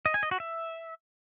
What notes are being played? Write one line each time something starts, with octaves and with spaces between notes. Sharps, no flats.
D#5
G#5
D#5
F#4
E5